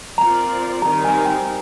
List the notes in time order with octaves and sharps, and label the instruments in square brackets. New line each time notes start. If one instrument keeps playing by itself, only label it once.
[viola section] C4 F4 A#4 D5 [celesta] A#5
[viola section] D#3 G3 C4 D#4 A#4 [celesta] A#5
[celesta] G#5
G5